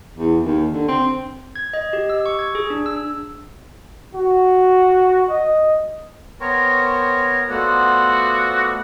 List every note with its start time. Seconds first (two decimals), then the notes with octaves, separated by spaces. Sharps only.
0.17 E2
0.43 D#2
0.72 D3
0.88 C4
1.56 G#6
1.73 D#5
1.93 G4
2.10 E6
2.26 C#6
2.39 G#6
2.55 G#4
2.70 D4
2.86 E6
4.15 F#4
5.30 D#5
6.41 B3 A#4 C5 C#5 G5 C#6
7.49 A3 B3 F4 F#4 C5 D5